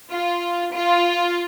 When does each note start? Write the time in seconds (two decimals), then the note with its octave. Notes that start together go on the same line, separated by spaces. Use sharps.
0.12 F4
0.75 F4